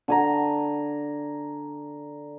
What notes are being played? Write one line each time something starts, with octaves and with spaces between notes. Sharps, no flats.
D3 G#5 A#5